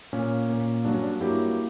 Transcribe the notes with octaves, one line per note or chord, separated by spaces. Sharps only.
A#2 A#3 C#4
A#2 A#3
G2 F#3 A#3 D4
C#4
D4
G2 F#3 A#3 E4 G4